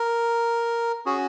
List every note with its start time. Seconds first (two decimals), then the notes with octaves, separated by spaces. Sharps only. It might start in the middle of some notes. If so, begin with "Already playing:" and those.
Already playing: A#4
1.06 C#4 F#4 G#4